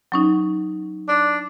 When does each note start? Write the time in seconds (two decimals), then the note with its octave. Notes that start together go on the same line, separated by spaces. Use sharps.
0.12 F#3 C#4 D#4
1.08 D4